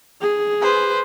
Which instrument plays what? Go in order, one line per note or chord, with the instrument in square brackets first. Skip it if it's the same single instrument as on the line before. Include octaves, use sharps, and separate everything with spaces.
[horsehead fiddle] G#4
[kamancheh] B4 C5